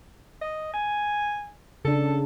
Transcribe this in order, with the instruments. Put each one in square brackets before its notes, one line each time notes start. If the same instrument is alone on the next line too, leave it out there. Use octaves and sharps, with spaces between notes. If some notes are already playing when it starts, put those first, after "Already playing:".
[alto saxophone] D#5
G#5
[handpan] C#3 D4 [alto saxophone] A4